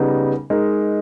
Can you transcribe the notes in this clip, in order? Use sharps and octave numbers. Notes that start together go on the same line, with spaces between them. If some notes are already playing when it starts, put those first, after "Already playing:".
Already playing: C#3 G3 B3 D#4
G#3 D#4 A#4